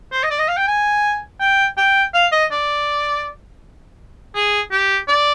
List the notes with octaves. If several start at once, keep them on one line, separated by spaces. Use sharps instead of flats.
C5
D#5
D5
D#5
F5
G5
G#5
G5
G5
F5
D#5
D5
G#4
G4
D5